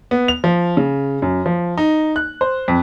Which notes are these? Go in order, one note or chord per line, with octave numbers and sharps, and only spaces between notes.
B3
F7
F3
C#3
F#2
F3
D#4
F#6
C5
F2